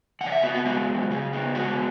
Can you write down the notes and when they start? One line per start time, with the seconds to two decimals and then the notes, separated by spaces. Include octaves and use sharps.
0.21 C#3 F#5
0.26 D5
0.32 E5
0.43 B3 F#4
0.55 F#4
0.65 G#3 F#4
0.88 F#2
1.10 C#3 G#4
1.33 B3
1.55 G#3 F#4